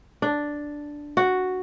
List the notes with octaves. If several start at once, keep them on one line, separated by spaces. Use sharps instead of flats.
D4
F#4